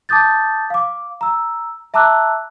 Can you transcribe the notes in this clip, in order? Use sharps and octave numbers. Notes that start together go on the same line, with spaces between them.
A5 D6 D#6 G6 A6
F5 D6
A#5 E6
E5 A5 A#5 D6 E6 F#6